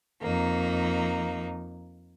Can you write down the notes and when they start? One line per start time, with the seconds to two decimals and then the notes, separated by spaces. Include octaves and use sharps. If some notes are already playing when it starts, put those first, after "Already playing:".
0.22 F2 A#3 D#4